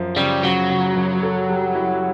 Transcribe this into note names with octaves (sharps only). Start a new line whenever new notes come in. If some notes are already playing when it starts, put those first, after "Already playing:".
Already playing: F#2 F3
C#3 G3
C#3 F#3
C#3
F#2
A4
G3
E4